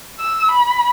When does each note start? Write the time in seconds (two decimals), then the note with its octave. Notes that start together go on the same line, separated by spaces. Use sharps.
0.20 E6
0.51 B5